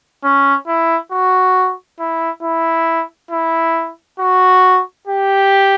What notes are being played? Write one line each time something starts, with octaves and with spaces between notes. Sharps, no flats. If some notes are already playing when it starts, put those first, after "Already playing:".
C#4
E4
F#4
E4
E4
E4
F#4
G4